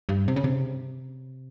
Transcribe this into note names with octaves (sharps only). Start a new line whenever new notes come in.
G2
C3
C#3
C3